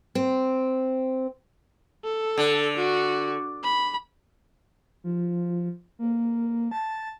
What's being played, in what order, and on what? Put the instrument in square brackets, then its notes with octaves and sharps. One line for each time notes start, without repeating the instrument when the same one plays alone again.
[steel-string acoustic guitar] C4
[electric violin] A4
[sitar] D3
[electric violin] F#4
B5
[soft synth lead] F3
A#3
A5